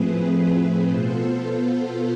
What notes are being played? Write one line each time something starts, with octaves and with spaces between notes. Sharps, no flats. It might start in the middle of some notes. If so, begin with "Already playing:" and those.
Already playing: A2 F3 A3 C4 G#4 B4
B2 B3 F4 A4 C5